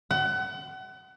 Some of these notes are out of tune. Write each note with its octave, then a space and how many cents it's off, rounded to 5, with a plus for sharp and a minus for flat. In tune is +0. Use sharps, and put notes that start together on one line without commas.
F#5 +30